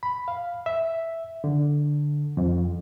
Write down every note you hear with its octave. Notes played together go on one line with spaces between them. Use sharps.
B5
F5
E5
D3
F2